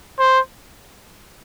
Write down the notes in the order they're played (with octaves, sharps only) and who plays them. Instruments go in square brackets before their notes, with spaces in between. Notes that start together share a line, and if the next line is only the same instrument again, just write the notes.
[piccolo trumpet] C5